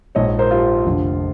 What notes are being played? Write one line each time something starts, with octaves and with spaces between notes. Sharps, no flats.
A#1 G#2 F3 C#5 D#5
A#4 C5
F4 G4
F1 F2 D3 F3